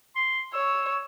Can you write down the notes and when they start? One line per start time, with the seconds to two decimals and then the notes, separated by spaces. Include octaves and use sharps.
0.15 C6
0.53 C#5 E6